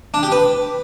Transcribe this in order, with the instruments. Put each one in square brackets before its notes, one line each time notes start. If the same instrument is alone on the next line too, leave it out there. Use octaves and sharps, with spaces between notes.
[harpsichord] D4
G4
B4